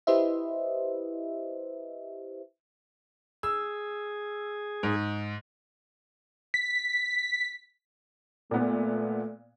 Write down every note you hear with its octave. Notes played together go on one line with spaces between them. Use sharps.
E4 G4 B4 C5 D#5 E5
G#4 E6
G#2
B6
A#2 A3 B3